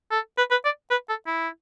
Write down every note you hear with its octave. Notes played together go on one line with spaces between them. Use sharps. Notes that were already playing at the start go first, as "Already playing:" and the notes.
A4
B4
B4
D5
B4
A4
E4